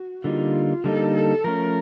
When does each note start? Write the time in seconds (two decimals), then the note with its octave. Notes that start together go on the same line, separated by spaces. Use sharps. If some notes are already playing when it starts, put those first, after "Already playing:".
Already playing: F#4
0.24 D3 G3 A#3 D#4 F4
0.84 D3 G3 A#3 D#4 A4
1.15 A4
1.44 F3 A3 C#4 A#4